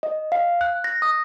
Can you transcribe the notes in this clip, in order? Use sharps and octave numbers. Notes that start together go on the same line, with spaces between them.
D#5
F5
F#6
A#6
D#6